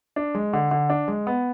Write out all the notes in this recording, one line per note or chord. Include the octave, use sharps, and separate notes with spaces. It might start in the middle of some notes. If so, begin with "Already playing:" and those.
D4
G#3
D3
D3
D4
G#3
B3